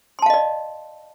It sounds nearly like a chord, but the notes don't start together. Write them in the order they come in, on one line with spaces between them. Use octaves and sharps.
C6 A5 F5 D#5 D5